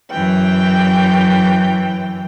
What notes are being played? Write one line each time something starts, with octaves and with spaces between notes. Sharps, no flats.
F#2 E3 G5